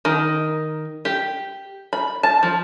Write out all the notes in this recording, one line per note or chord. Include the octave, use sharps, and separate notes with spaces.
D#3
G4
B5
A5
F3